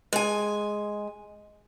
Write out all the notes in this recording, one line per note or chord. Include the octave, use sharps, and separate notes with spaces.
G#3 G#5